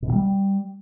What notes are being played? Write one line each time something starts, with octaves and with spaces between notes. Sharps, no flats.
B2
D3
G3